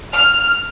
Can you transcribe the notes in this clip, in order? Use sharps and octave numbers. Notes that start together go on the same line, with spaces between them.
F6